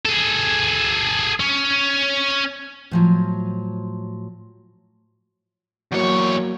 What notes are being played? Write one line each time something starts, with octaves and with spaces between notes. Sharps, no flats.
G#4 A4
C#4
A2 F3 F#3
E2 F#3 A#3 F#4 C#5